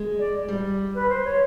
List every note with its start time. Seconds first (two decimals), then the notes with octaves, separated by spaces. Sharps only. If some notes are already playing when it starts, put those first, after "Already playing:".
Already playing: G#3
0.19 D5
0.48 G3
0.94 B4
1.09 C5
1.24 C#5